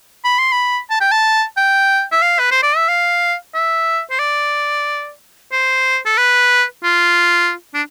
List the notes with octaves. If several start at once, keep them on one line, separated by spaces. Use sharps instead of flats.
B5
C6
B5
A5
G5
A5
G5
E5
F5
B4
C5
D5
E5
F5
E5
C5
D5
C5
A4
B4
F4
D4